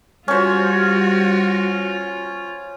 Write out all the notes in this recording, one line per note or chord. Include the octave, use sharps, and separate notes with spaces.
G3 C#4 F4 F#4 C5